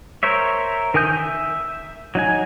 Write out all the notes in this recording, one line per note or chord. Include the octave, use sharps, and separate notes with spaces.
A#4 C5 C#5 E5
D#3 A#4 G#5 D#6 G6
E5
F#3 D#4 G#5